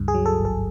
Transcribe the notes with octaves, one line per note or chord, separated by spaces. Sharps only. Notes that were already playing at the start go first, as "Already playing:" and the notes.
Already playing: C#2 G2
G#4
F#3
A4
G#1
A4